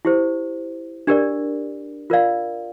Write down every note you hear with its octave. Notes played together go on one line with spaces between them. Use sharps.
E4 G4 C5
D4 G4 A#4 D5
F4 A#4 D5 F5